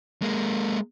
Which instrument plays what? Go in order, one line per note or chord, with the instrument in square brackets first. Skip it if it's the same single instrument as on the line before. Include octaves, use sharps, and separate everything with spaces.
[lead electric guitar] G#3 A#3